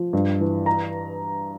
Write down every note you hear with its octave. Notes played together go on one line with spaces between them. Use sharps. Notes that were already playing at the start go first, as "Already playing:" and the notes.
Already playing: F3
G2
E3
A#5